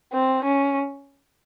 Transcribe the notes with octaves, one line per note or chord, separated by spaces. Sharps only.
C4
C#4